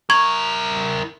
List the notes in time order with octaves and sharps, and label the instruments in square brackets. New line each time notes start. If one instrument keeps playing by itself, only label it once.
[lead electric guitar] E4 A#4 [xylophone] C#6 G#6